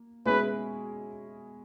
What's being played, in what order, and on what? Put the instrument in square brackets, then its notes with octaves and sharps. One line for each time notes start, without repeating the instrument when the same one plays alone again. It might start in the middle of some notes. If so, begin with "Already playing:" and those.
Already playing: [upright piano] A#3
[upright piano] B2 G#3 C#4 E4 G#4 [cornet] B4